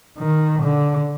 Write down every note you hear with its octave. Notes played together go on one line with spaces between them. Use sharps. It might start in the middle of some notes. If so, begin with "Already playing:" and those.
D#3
D3